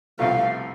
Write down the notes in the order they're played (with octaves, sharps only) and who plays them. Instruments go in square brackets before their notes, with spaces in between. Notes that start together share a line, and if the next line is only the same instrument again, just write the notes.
[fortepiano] C2 C3 F3 A3 [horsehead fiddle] F5